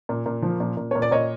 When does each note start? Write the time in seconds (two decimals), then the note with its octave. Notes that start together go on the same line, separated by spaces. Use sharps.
0.09 A#2
0.26 A#2
0.42 F3
0.60 A#2
0.77 A#2
0.91 A#2 C#5
1.02 D5
1.11 A#2 C#5 D#5